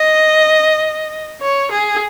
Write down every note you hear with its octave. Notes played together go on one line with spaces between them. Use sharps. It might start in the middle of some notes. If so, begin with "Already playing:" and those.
Already playing: D#5
C#5
G#4